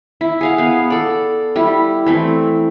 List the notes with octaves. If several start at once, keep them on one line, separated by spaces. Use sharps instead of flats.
E4
G#4 F5 F#5
B3 F5
A4 D5
G3 E4
E3 A3 C4